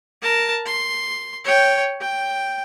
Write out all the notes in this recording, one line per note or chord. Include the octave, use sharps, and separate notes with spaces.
A#4 A5
C6
C#5 G5
G5